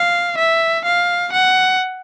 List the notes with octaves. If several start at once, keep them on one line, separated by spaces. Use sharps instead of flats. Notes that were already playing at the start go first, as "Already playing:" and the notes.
Already playing: F5
E5
F5
F#5